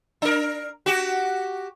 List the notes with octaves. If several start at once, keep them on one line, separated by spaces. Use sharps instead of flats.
D4 A#4
F#4 G4